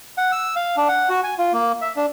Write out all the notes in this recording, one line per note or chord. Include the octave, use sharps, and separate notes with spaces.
F#5
E6
F5
D4
F#5
F#4
G#5
F4
A#3
E5
D4